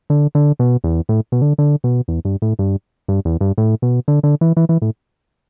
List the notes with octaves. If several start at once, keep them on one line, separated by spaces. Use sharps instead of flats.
D3
D3
B2
E2
A2
B2
D3
D3
B2
E2
G2
A2
G2
G2
E2
G2
A2
B2
D3
D3
E3
E3
E3
A2